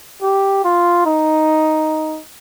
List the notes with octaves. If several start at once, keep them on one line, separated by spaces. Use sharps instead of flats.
G4
F4
D#4